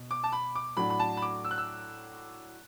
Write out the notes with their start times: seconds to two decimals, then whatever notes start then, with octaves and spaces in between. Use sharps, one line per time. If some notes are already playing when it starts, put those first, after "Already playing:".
Already playing: B2
0.11 D6
0.24 A5
0.32 B5
0.55 D6
0.77 A2 F#3 D4 B5
0.90 B5
1.00 A5
1.17 B5
1.22 D6
1.45 E6
1.51 F#6
1.58 E6